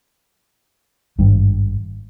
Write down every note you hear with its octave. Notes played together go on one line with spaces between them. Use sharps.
G#1 G2